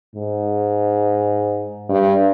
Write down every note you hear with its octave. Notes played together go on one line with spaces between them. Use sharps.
G#2
G2